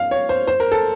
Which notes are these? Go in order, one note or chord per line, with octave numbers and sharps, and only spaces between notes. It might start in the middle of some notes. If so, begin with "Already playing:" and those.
Already playing: F5
C#5
C5
C5
A#4
A4